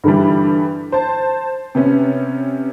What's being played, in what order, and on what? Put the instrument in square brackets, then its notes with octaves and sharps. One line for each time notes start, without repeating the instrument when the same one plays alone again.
[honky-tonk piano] G2 D3 E3 G3
C5 A5
C3 B3 C#4